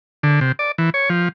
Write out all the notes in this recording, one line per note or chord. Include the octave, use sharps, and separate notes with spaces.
D3
C3
D5
E3
C#5
F3